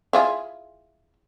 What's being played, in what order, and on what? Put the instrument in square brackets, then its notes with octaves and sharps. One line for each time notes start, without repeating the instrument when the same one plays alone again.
[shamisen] E4 F4 G#4